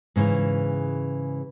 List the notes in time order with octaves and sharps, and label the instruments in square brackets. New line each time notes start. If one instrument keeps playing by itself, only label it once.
[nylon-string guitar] G#2 C#3 E3 C#4